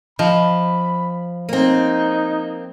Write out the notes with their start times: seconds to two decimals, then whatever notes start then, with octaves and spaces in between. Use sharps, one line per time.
0.19 F3 D#5 B5
1.49 A#3 C4 D#4